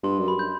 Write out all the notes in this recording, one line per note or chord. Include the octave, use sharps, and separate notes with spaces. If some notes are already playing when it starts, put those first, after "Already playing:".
G2 C6
F#2
B5
G6